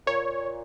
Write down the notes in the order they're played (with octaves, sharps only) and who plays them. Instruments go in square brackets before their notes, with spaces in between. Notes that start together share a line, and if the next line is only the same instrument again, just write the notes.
[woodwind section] A#2 [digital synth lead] C#5